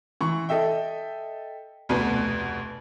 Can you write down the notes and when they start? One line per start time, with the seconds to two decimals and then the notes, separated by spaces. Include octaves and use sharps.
0.21 E3 C#6
0.49 A4 D#5 E5 G5
1.89 F1 D2 B2 B3 B4